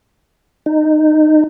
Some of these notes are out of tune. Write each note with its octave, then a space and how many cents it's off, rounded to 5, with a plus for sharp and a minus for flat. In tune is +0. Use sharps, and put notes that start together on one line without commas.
D#4 -20